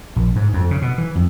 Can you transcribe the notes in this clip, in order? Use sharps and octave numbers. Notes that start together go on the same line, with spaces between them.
A#1
G#2
F2
C#3
B2
E3
F2